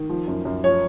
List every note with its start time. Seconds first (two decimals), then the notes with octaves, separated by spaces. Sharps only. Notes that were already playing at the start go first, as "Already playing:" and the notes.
Already playing: D#3
0.10 F3
0.28 F#2
0.45 F#2
0.64 F3 C#5